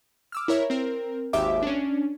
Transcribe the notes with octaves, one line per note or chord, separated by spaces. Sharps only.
D6 E6 F6
E4 A#4 C#5 E5
C4 A#4
G#1 D#2 G4 E5 D6
C#4 D4